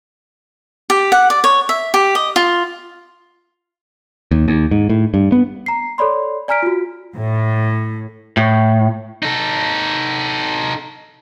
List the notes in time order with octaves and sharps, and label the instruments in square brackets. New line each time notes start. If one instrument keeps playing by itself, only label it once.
[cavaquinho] G4
F#5
D5
C#5
E5
G4
D#5
F4
[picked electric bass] D#2
D#2
G#2
A2
G2
B3
[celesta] A#5 C7
A4 C#5 D5 B5 C6
D5 G#5 A#5 F6 B6 D7
F4 F#4
[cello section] A2
[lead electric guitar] A2
D#4 A4